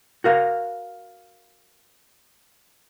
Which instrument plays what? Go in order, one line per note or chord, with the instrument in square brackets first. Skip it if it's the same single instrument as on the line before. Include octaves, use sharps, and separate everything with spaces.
[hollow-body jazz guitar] F#4 A#4 F5